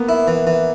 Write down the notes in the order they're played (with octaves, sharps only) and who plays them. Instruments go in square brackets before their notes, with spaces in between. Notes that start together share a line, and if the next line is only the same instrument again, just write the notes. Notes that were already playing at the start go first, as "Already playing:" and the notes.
Already playing: [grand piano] A#3 B3
[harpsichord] E4
E3
E3